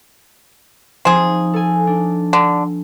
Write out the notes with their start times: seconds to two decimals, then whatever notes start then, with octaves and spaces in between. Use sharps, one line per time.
1.05 F3 C4 D#4 G#4
1.53 A4 G#5
1.87 D4
2.33 D3